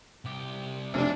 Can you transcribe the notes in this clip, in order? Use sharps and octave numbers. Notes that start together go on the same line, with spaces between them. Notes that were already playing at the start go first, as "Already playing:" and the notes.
C2 G4
F1 B2 D4